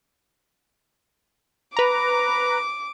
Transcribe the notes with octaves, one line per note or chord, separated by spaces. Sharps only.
B4 A#5 D6